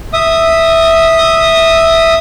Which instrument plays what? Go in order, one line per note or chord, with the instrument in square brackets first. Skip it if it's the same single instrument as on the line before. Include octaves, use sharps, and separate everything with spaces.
[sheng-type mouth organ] E5 D#6